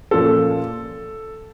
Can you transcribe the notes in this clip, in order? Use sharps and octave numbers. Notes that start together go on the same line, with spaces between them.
A#2 F3 A#3 C#4 F4 A4